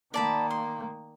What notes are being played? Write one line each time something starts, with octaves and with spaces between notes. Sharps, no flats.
D#3 A#3 D5 A5 B5
C6